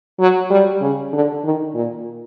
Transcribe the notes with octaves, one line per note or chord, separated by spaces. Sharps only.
F#3
G3
C#3
D3
D#3
A#2